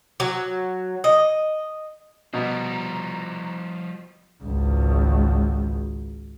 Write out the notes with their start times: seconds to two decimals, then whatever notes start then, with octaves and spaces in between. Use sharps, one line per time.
0.20 F#3
1.04 D#5
2.34 B2 F3 G3 A#5
4.43 G#1 C#2